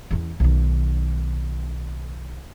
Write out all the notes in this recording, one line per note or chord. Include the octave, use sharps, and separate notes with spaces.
E2 C#4
B1 D#3